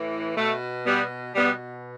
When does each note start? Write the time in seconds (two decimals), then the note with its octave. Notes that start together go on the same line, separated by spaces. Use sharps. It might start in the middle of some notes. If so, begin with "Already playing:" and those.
Already playing: A2 E3
0.36 B2 A3
0.86 G3 B3
1.35 B2 G3 B3